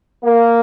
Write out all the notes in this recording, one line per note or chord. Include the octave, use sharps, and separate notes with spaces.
A#3